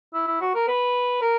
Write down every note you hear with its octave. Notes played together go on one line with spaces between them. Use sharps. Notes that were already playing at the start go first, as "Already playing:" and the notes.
E4
E4
F#4
A#4
B4
A#4